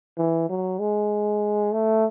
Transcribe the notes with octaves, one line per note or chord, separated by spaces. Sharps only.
E3
F#3
G#3
A3